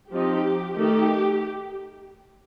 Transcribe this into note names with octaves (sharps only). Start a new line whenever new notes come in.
F3 C4 D#4 G4
D#3 A3 D#4 G4